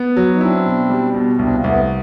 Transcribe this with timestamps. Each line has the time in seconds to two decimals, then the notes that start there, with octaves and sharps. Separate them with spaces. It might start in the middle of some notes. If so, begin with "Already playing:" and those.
Already playing: B3
0.17 F#3
0.33 D#4
0.40 C4 D4 E4
0.66 B2
0.90 G3
1.14 B2
1.39 C2 C4 D4
1.54 A#3
1.63 C2 A3 B3